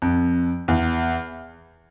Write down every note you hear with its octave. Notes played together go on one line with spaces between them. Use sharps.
F2
E2